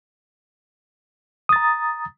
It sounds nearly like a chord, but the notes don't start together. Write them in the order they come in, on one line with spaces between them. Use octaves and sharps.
D#6 A6 A#5